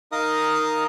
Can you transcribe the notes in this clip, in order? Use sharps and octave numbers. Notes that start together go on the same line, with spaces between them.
D#4 A#4 D#5 F5 A#5 D#6